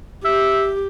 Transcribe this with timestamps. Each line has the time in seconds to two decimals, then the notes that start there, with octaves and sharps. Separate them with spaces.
0.25 G4 E5